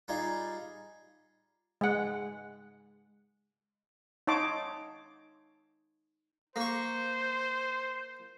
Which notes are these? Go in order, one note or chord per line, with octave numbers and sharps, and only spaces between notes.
G3 D#4 F4 G#4
G#3 F#5
D#4 C#5 A5 C6 D6
A#3 C5 C#6